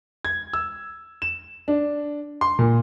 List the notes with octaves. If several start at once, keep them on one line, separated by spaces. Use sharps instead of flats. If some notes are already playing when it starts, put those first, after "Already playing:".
G#6
E6
E7
D4
C6
A#2